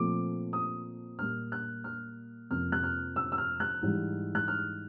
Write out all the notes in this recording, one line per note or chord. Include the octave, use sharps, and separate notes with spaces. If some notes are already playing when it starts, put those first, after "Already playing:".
Already playing: A#2 F3 A3 C4 D6
D#6
A#2 G3 A#3 F6
F#6
F6
F2 C3 F3 A#3 F6
F#6
F6
E6
E6
F6
F#6
G#2 E3 G3
F#6
F6